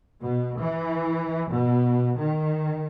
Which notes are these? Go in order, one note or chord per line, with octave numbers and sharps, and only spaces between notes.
B2
E3
B2
D#3